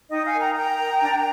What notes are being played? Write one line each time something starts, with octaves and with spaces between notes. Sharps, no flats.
D#4 D#5 G5
F5 G#5
A#4
G5 A#5
A#4 G5 A#5
A#4
D4